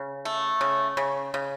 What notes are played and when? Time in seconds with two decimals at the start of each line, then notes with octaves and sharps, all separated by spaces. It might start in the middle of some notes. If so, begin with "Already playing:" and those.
Already playing: C#3
0.25 A3
0.61 C#3
0.97 C#3
1.34 C#3